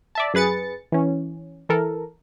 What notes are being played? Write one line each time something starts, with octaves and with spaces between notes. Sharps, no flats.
D5 E5 A5
F#2 G#4 B4 A6 C#7
E3 C#4
E3 A4 A#4